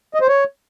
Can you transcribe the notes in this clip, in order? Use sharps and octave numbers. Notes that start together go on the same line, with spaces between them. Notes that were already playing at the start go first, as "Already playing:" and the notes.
D#5
C5
C#5